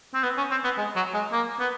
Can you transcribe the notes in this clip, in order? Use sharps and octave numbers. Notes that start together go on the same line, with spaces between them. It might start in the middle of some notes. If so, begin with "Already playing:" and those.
C4
B3
C#4
C4
B3
G#3
F#3
G#3
A#3
B3